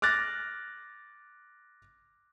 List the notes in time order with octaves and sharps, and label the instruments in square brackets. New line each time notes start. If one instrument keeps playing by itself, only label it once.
[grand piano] D6 F6 F#6 A6 A#6